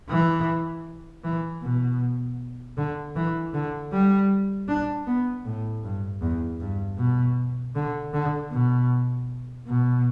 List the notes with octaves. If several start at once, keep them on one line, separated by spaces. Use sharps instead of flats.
E3
E3
B2
D3
E3
D3
G3
D4
B3
A2
G2
E2
G2
B2
D3
D3
B2
B2